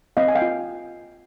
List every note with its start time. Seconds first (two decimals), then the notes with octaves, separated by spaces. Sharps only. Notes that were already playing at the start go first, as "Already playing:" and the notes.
0.17 C4 D#5 F5
0.28 G#5
0.35 F5 G5
0.42 F4